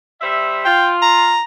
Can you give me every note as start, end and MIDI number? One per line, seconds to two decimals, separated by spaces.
0.21 0.65 55
0.21 0.65 72
0.21 0.65 76
0.65 1.35 65
0.65 0.90 79
1.02 1.43 82